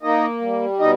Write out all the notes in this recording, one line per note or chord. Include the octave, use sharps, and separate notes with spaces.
A#3 D#4 D#5
G3
B2 D#4 D#5